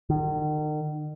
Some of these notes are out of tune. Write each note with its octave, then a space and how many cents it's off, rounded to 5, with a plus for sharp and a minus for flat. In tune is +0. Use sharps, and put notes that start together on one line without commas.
D#3 -40